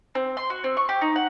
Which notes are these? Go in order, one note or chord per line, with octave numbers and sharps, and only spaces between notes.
C4
C6
F#4
C4
C#6
G4
D#4
F#5